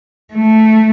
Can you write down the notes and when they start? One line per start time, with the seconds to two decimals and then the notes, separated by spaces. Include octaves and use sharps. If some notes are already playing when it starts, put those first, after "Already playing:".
0.34 A3